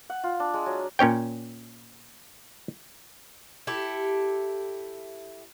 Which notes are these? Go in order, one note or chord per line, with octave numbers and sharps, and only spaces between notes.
F#5
F4
D4
G#3
F#3
A#2 C#4 C#5 G5
E4 G4 A4